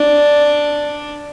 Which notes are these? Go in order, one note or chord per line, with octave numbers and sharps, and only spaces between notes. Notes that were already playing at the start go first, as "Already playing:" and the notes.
Already playing: D4